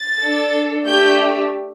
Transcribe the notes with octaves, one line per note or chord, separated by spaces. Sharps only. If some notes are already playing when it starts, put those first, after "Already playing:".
Already playing: A6
D4 A4
A3 D4 G4 G6